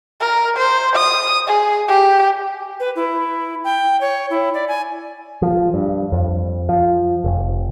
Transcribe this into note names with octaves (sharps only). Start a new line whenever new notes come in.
A#4
C5
D#6
G#4
G4
B4
E4
G5
C#5
E4
D5
G#5
F3
G2
F2
F3
F1